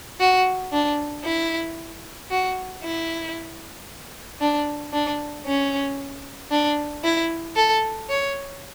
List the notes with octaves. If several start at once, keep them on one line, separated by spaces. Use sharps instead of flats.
F#4
D4
E4
F#4
E4
D4
D4
C#4
D4
E4
A4
C#5